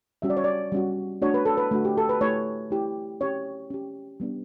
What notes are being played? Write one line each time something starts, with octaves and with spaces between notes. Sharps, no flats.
G3 C#4 F#4 E5
D5
C#5
D5
G3 C#4 F#4
A3 D4 F#4 C#5
B4
A4
B4
A3 D4 F#4
G4
A4
B4
A3 E4 G4 C#5
A3 E4 G4
C#4 G4 C#5
C#4 G4
G3 B3 D4 G4